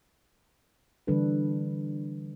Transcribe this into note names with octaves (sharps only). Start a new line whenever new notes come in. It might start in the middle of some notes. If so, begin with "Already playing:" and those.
D3 E3 G3 D4 A4 B4